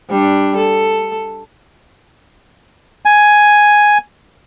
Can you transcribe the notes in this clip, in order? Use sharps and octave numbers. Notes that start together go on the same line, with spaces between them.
G3 D4
A4
G#5